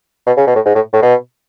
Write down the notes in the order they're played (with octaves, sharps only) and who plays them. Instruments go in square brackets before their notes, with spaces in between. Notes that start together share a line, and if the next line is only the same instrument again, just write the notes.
[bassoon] B2
C#3
B2
A2
G#2
A2
A2
B2